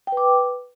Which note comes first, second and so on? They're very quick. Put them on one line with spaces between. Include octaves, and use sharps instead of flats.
G5 B4 D6